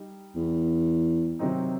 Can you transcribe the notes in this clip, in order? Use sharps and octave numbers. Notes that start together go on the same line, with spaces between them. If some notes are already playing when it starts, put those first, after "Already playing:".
Already playing: G3 D#4
E2
C3 D#3 F#3 C4 D#4